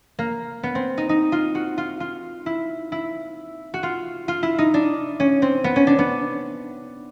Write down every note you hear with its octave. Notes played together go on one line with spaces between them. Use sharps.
A#3
B3
C4
D#4
D#4
F4
F#4
F4
F4
E4
E4
F#4
F4
F4
E4
D#4
D4
C#4
C4
B3
C#4
D4
B3